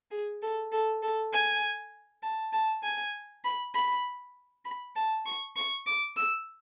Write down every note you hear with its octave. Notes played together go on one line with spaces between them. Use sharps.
G#4
A4
A4
A4
G#5
A5
A5
G#5
B5
B5
B5
A5
C#6
C#6
D6
E6